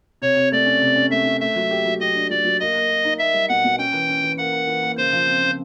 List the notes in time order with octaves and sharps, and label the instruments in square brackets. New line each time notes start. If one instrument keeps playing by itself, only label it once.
[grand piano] C3 [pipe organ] C#5
[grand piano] C3
[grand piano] A3 [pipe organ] D5
[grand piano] C#4
C3
C#4
[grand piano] A3 [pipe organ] E5
[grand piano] C#4
[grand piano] A3 [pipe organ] E5
[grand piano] F#3
G4
F#3
[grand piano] G4 [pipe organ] D#5
[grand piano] D4
[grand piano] F#3 [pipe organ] D5
[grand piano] F#3
[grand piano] A#3 [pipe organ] D#5
[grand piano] A#3
A#3
D#4
[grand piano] A#3 [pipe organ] E5
[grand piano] G3
[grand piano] B2 [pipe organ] F#5
[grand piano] B2
[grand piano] C#4 [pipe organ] G5
[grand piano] E3
C#4
E3
[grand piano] A#3 [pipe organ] F#5
[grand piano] A#3
E3
A#3
[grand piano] C#3 [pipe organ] C5
[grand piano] F3
C4
C#3